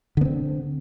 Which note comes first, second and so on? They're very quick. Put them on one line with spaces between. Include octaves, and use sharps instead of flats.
D3 B3 C4